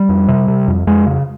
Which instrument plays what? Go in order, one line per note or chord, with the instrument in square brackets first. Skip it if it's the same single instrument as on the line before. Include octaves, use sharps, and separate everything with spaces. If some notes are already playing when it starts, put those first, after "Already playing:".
Already playing: [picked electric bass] G3
F2
C3
C3
F2
F2 G#3
C#3